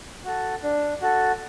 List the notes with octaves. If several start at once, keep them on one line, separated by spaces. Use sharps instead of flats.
F#4 A4
D4
F#4 A4